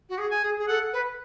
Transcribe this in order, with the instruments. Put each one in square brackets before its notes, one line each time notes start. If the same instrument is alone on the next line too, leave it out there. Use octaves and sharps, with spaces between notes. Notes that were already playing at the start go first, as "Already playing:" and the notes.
[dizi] F#4
G#4
[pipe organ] G#5
[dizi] G#4
G#4
[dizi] A4 [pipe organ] F#5
[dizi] B4